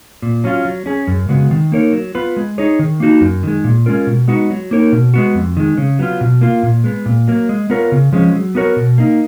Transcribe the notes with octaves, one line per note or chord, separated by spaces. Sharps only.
A#2
F#3 C#4 F4
F#3
C#4 G#4
F#2
C#3 G#3 B3 F#4
D#3
A#3 D#4 A#4 C#5
F#3
B3 F4 B4
G#3
D#4 G#4 C#5
D#3
A#3 D#4 F#4
F#2
D#3 G#3
A#2
G#3 C#4 F4 A#4
B2
G#3 B3 D#4 F#4
F#3
A#3 D#4 A#4 C#5
B2
G#3 B3 F#4
F2
D#3 G#3
C#3
F#3 B3 F4
B2
A#3 F4
A#2
G#3 B3
A#2
F#3 A#3
G#3
B3 F4 A#4 C#5
C#3
F3 G#3 C#4
F#3
B3 F#4 A#4 C#5
B2
A#3 D#4